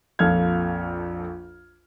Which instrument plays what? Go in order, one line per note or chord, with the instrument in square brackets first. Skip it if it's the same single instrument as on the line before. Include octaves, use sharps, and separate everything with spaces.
[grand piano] A#1 F2 A4 F5 F6 G#6